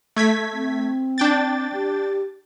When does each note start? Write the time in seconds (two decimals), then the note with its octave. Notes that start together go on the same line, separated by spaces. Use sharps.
0.16 A3 G#6 B6
0.53 C4
1.18 D4 G5 A6
1.74 G4